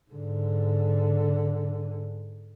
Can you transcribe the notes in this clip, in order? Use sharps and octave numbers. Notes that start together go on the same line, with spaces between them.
G#2 D3